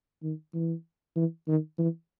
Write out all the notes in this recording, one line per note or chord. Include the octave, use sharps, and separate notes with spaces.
D#3
E3
E3
D#3
E3